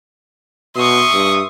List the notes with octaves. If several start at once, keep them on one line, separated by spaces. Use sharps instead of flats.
B2 E5 C6 C#6 D#6
G2